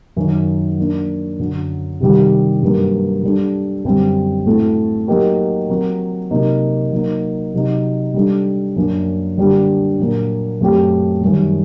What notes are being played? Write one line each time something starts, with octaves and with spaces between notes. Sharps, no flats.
F#2 D#3 F#3
F#3 A#3 D4
F#2 D3 F#3
C3 D#3 G3
G2 F#3 A#3
G3 D4 A4
F#2 D3 G3 C4
A2 A3 C4 F#4 A4
F#3 A#3 D#4 G4 A#4
F#3 C4 F#4 A#4
C3 F#3 A#3 D#4
F#3 A#3 D#4
C3 F#3 C4 D#4
G3 D4 A4
F#2 F#3 A#3 D4
D3 G3 A#3 D4 G4
A#2 F#3 A#3 D4
F#2 F#3 A3 C4 G4
F#2 D#3 G3